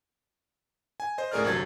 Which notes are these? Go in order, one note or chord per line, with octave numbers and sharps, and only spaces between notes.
G#5
C5 D#5
C#2 A2 G#4 A#4 D5 F6
G1 C3 F#3 G#6 A6